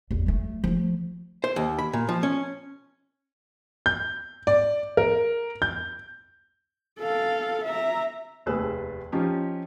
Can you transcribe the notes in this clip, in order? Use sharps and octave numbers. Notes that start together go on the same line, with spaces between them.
A1 E2
F#3 A3
F3 A3
C5
D#2
B5
A#2
F3
C#4
G6
D5
A#4
G6
A4 F5
E5 A#5
F1 D#2 G#4 B4 E6
F3 C#4 D#4 F4 G4